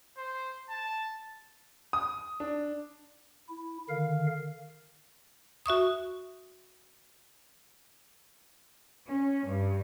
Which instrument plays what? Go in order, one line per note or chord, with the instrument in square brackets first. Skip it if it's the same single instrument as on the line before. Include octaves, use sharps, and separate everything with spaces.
[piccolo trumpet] C5
A5
[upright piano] D#6
D4
[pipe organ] E4
D3 D#3 A#4 F5
[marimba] F#4 E5 C#6 D#6
[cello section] C#4
G2